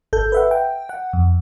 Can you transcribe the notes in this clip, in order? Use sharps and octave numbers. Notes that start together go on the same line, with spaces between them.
G#1 A4 G6
B4 E5 F#5
G5
F#5
F2